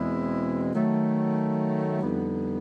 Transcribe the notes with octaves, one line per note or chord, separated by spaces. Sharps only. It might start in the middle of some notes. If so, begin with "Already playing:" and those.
Already playing: E2 B2 G#3 C4 E4
D#3 F#3 A3
F2 D3 G3 B3 D#4